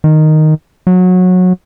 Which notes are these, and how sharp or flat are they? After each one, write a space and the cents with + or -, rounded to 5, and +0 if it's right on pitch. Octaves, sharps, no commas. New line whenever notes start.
D#3 -5
F#3 -20